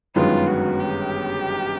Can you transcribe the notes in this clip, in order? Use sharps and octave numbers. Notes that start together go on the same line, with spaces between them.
G1 F#2 D#3 G#3 B3 F4
F#4
G4